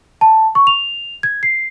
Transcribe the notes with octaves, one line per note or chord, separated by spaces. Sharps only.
A5
C#6
F7
G#6
C7